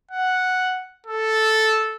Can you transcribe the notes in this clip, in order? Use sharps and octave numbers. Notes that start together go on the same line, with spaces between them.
F#5
A4